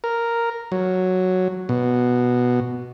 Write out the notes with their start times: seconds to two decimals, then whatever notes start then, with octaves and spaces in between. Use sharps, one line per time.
0.04 A#4
0.72 F#3
1.69 B2